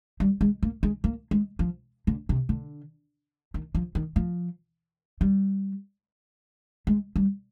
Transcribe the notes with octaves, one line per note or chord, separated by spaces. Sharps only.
G3
G#3
A#3
G#3
A#3
G#3
F3
D3
C3
D3
D#3
F3
D#3
F3
G3
G#3
G3